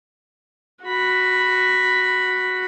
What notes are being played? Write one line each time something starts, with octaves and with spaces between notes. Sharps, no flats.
F#4 B5